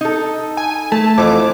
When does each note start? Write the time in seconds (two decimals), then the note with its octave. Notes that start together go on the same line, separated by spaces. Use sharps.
0.01 D#4 A4
0.57 G#5
0.92 A3 A5
1.18 F2 E3 D6